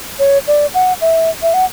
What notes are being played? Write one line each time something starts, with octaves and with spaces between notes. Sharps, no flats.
C#5
D5
F#5
E5
E5
F#5